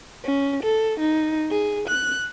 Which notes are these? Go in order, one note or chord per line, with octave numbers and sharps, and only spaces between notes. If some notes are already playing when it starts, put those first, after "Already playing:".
C#4
A4
D#4
G#4
F#6